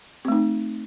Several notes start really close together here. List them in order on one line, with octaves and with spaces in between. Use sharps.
C4 A3 D#4